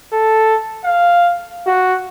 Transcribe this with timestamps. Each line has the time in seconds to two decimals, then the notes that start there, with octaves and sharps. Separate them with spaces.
0.13 A4
0.84 F5
1.66 F#4